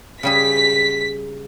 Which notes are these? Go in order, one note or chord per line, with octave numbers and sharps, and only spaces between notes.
C#3 G3 G#4 B6